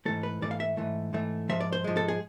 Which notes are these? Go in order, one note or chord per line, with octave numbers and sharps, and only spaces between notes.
G#2 E3 A3 A4
B4
G#2 E3 A3 D5
F5
E5
G#2 E3 A3
G#2 E3 A3
G#2 F3 G#3 E5
D5
C5
G#2 F3 G#3
A4
G#4